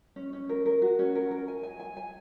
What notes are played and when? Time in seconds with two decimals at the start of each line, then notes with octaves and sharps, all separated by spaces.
0.16 C#4
0.33 C#4
0.49 A#4
0.66 A#4
0.82 F#4
0.99 C#4
1.15 A#4
1.31 A#4
1.48 G#5
1.63 G#5
1.80 G#5
1.97 G#5